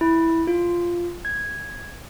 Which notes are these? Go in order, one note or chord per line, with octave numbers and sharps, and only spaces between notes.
E4
F4
G#6